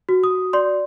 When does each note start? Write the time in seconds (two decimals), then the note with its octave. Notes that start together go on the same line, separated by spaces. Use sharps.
0.09 F#4
0.24 D#6
0.53 D5 C6